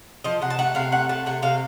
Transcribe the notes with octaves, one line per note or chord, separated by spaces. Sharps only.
F3 D#5
C3 F#5
A5
A3 F#5
C3 F5
A3 F#5
A3 A5
C3 F#5
C3 F5